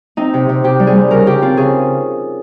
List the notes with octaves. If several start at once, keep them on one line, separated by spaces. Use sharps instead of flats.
C4 D#4
C3
C3
C3 G4
G3
G#4
G3
C#3 A#4
C#3 G4
C4 F4
C#3 G#4